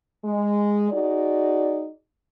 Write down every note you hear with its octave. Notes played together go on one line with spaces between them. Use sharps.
G#3
D#4 F#4 G#4 D5